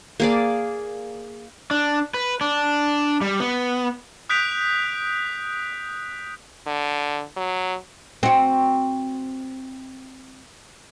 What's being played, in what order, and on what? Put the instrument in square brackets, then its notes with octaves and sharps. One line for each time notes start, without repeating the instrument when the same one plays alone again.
[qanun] A#3 G#4 D5
[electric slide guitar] D4
B4
D4
G3
B3
[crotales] D#6 F#6 G6 B6 D7 F7
[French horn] D3
F#3
[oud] C4 F#4